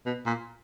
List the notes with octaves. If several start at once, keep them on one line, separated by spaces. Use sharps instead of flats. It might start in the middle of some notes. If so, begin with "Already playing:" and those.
B2
A#2